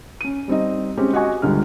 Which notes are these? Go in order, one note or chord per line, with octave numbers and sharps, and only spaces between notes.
C#4 D#7
G3 C4 D#4 D#5
G#3 C4 C#4 G4
F#4 G4 D#5 F#5 G#5 C#6
G1 C#2 D3 G3 F6